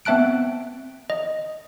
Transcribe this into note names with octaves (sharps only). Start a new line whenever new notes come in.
B3 C4 E5 A5 F#6 D7
D#5